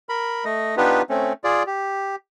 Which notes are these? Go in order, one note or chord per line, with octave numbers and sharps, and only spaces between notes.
A#4 B5
A3 D#5
B3 D4 D#4 F4 G4 B4
A3 C4 C#4
F4 G#4 D5
G4